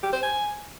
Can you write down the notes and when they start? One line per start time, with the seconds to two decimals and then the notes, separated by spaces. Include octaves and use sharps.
0.03 G4
0.13 C5
0.23 G#5